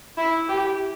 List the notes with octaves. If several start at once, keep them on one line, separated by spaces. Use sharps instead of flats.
E4
G4